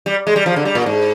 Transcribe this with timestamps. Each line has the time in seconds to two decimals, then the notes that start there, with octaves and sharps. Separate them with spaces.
0.06 G3
0.27 G#3
0.36 G3
0.46 F3
0.56 D3
0.65 G3
0.75 A#2
0.86 G#2